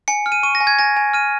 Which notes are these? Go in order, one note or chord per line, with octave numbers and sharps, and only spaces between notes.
G#5 C#7
F6
D#7
C#6 D#7
A#6
G#5
G#6
G#5 A#6
G#5
F6 D#7